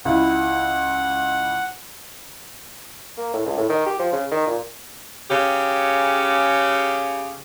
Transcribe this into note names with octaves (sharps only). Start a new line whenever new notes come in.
C#2 E4 F#5
A#3
A2
C#2
A2
D#3
G4
F3
C#3
D#3
A#2
C#3 G4